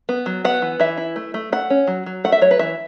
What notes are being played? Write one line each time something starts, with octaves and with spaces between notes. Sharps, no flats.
B3
F#3
B3 F#5
E3
E3 E5
E4
A3
A3
A3 F#5
C#4
F#3
F#3
A3 F#5
E5
F#3 C#5
B4
E3 E5